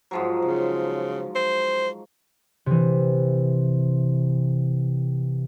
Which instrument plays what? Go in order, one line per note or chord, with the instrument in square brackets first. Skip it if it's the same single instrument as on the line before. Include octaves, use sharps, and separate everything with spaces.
[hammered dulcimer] G#2 F3 F#3
[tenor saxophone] C#3
C5
[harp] C3 E3